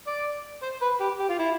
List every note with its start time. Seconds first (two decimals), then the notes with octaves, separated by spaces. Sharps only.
0.07 D5
0.62 C5
0.82 B4
1.00 G4
1.19 G4
1.29 F4
1.39 E4